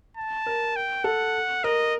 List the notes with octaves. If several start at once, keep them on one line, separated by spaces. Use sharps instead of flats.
A5
A#4
G5
A4 F#5
A#4 D#5